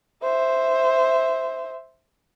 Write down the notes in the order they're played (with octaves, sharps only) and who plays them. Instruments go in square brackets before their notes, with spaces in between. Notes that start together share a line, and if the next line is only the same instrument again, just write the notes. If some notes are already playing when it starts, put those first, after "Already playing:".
[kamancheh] C5 E5